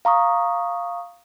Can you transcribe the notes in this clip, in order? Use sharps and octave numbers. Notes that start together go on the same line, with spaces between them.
F5 A#5 C#6 D#6